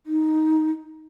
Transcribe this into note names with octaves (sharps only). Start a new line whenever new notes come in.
D#4